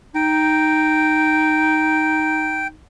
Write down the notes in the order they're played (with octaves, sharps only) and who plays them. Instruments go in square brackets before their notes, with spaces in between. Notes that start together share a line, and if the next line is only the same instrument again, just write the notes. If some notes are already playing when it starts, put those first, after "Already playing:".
[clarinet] D#4 [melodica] G5